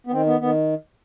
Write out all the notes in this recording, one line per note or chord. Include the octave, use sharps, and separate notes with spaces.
B3
D#3 C4
B3
D#3 B3